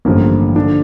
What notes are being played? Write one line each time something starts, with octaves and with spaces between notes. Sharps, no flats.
A1 G2 D3 F3 A#3
D3 F3 D4